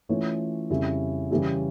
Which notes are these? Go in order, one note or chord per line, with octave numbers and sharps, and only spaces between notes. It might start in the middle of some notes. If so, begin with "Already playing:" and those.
E3 A3 C#4 F4 C#5
F2 C#3 G3 C#4 E4
C#3 E3 G3 C#4 E4